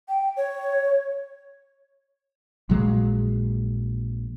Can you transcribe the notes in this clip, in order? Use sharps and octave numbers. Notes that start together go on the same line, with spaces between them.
G5
C#5
A#1 A#2 F#3 G#3